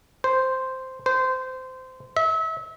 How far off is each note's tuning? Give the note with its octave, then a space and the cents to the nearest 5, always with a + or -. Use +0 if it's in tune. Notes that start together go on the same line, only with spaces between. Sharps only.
C5 -5
C5 -20
E5 -35